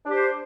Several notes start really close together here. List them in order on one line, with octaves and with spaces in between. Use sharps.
D4 G4 C5